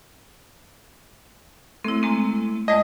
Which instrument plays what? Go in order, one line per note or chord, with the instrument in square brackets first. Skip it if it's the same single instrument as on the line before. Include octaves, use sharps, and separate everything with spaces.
[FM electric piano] A3 [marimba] C4 E4
[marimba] G#3 A#3 C4
[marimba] F2 G#3 D5 [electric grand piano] D#5